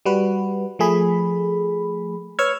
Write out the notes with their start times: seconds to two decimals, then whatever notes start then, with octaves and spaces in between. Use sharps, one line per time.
0.06 G3 F#4 B4
0.79 F3 A3 G#4 B5
2.39 B4 C#5 C#6 E6 F6 G#6